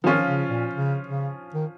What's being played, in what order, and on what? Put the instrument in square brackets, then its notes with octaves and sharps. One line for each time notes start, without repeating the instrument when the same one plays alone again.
[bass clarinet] D#3 [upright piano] F3 C#4 F4
[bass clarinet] C#3
A#2
C#3
C#3
D#3